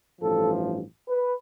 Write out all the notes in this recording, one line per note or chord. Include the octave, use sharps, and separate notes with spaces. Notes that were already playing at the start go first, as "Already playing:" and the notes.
A1 G2 F3 A4
B4